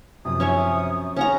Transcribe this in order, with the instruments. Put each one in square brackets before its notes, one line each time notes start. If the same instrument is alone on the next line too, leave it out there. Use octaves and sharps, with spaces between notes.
[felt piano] F#2 C3 F3 [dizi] D#6
[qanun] C#4 C#5 E5
C#4 F#5 A#5